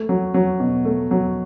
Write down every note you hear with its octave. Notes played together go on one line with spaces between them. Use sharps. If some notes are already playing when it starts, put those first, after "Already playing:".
Already playing: A3
F#3
F#3
B2
A3
F#3